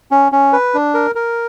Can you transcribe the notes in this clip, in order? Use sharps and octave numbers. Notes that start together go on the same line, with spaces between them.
C#4
C#4
B4
D4
A#4
A#4